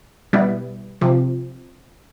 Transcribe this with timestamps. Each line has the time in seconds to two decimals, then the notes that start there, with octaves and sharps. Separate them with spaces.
0.33 B2 G3 B3 E4
1.01 C3 F3